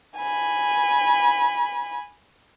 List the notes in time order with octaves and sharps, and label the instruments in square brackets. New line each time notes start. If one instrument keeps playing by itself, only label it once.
[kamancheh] G#5 B5